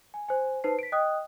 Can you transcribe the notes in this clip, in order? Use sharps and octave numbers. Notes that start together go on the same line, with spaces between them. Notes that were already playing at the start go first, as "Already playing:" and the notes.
G#5
C5 G#5
D#4 B4 C5 A5 C7
B6 D7
D#5 G5 D#6 F#6